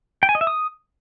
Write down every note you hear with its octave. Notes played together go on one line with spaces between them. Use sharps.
G5
G#5
D#5
E5
D#6